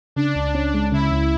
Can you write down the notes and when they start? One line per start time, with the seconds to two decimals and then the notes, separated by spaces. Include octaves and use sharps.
0.16 C#3 D4
0.36 C#2
0.55 C#4
0.74 G#3
0.92 C#3 E4
1.12 C#2